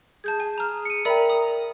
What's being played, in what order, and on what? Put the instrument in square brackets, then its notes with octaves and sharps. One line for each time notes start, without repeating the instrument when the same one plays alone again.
[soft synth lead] G#4 [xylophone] A5 G6 G#6
[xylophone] G#5
A#5 F6
[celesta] C#7 D#7
[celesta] A#4 G5 [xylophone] D5 E5 B5 [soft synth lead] A#5
[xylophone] D#6